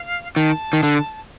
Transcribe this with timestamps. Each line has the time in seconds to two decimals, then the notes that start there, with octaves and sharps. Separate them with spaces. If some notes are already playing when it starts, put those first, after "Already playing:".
Already playing: F5
0.36 D#3 A5
0.73 D#3
0.83 D3